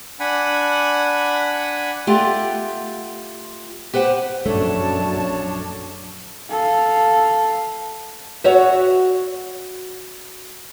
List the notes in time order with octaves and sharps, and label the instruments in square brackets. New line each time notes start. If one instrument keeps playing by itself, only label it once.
[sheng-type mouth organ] D4 F#5 G#5 B5
[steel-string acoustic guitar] A3 F4 G4 F#5
G4 B4 C5 F#5
[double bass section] A#1 F#2 [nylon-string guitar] A3 [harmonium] D4 C#5 [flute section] A5
[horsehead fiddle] A4 F5
[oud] F#4 C#5 E5